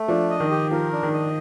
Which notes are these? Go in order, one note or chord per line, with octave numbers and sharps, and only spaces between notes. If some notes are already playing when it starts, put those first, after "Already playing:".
Already playing: A3
F3 D4
D#5
D#3
G4
F3 A#4
D4
D#3
D#5